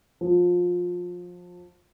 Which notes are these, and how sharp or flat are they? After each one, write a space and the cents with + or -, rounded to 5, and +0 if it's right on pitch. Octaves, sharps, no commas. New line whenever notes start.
F3 +20